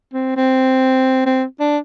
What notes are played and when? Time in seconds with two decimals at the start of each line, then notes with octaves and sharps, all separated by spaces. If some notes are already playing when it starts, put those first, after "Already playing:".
0.14 C4
0.36 C4
1.26 C4
1.60 D4